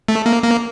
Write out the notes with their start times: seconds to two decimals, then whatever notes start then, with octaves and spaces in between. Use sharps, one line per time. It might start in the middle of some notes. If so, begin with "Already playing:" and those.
0.08 A3
0.26 A#3
0.44 A#3